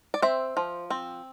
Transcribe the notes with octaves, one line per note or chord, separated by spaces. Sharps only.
D5
C4 C5 E5
F3
C4